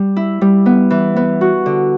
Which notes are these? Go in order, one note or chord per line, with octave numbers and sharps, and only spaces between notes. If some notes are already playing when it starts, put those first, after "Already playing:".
Already playing: G3
E4
G3
B3
E3
B3
F#4
D3